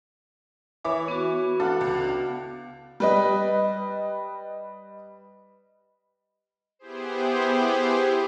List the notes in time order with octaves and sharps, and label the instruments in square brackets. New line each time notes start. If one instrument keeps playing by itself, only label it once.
[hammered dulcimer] E3 [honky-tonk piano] E4 C#5 D6
[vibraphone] B3 F#4
[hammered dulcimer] D4 F5 F#5 [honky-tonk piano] A4
[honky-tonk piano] C#2
G3 B4 D#5
[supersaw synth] B3 E4 G4 G#4 C5